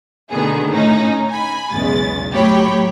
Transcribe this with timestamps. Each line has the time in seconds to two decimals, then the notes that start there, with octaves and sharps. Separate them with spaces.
0.30 B2 D3 D#3 A3 B3 G#4
0.71 A2 C#4 D#4
1.29 G#5 B5
1.71 B1 E2 C#3 G#3 A6
2.31 A2 F#3 G4 C#5 G5 B5